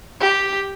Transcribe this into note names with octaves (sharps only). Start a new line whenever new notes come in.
G4